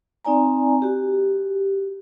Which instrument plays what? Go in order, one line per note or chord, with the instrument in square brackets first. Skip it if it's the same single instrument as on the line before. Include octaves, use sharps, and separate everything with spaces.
[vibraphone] C4 D#4 D5 G#5 A#5
F#4 G4